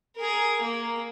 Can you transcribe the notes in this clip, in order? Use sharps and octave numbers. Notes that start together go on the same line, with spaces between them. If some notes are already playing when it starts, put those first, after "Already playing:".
G#4 A#4
A#3